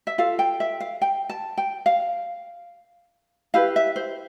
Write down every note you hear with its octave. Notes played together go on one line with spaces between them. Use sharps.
E5
F4 A4 F5
G5
E5
F5
G5
A5
G5
F5
E4 G4 B4 F5
E5
C5